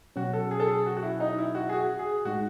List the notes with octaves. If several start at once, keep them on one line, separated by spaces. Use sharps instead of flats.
B2 F#3 C#4 F#4
A4
G#4
A4
G#4
F#4
F#4
E4
D#4
E4
F#4
G#4
F#4
G#4
A2 G#3 D#4 F#4